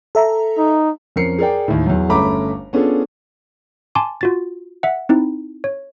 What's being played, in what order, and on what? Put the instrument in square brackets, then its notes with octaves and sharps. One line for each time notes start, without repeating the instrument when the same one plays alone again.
[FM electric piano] A4 E5 A#5
[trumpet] D#4
[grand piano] F2 C#4 A#4 C7 C#7
G#4 A#4 D5 G5
D#2 A2
E2 F#3
G1 A3 C#4 A#5 B5 D6
B3 C#4 D4 F4 G#4 A4
[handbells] G#5 A5 C6 D6
F4 F#4 A6
E5 F#5
C4 D#4 E4
C#5